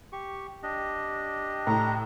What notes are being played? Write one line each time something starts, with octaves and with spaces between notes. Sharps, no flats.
G4 C#6
D4 G4 D#5
A2 A#5